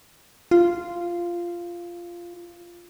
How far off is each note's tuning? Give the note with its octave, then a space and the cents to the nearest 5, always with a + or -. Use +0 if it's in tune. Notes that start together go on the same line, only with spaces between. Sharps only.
F4 -10